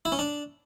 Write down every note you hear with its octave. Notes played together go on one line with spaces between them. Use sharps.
E4
C#4
D4